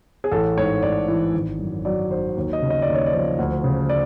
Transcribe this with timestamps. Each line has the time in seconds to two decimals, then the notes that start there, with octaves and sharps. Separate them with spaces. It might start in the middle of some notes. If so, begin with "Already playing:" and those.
0.24 G#4
0.32 A1 A4
0.57 G#2 C#5
0.82 A1 D5
1.08 E3
1.34 G#1
1.59 F#2
1.85 F#3 D5
2.11 D#3 C5
2.36 D#2
2.53 D#5
2.62 C#3
2.70 D#5
2.82 D5
2.88 D#2
2.94 C#5
3.06 D5
3.13 F3
3.38 D2
3.64 C#3
3.90 D5